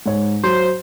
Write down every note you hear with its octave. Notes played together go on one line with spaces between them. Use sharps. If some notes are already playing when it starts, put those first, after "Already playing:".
G#2 C#5
F#3 C5